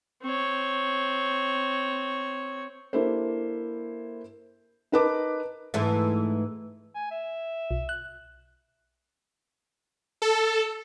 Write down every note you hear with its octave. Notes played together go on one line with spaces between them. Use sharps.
C4 C#5
A#3 D4 E4 G4 A4 C5
D#4 A#4 B4 A5 D6
G#2 E3 A3
G#5
E5
B1
F#6
A4